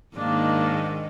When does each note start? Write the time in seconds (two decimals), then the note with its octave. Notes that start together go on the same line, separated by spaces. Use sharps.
0.17 G#2 D#3 A#3 D4